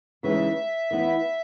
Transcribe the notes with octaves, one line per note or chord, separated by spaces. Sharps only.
C#3 E3 G#3 B3 D#4 E5
E3 B3 E4